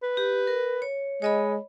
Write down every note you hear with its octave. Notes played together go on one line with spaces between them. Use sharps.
B4
G4
A#4
C#5
G#3 C#5 D#5 B5